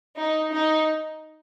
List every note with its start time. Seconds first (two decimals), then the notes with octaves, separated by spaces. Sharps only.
0.14 D#4
0.52 D#4